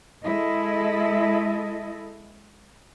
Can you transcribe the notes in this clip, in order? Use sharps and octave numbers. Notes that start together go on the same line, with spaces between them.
G#3 E4 A4 D#5